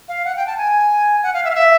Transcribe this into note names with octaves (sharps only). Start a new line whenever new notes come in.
F5
F#5
G5
A5
G#5
F#5
F5
E5
F5
E5